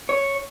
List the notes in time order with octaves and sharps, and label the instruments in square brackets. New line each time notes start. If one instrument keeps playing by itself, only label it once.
[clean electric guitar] C#5